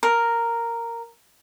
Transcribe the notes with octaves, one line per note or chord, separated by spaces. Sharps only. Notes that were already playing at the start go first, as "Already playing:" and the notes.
A#4